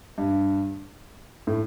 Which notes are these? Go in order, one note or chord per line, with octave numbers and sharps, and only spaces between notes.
G2
A2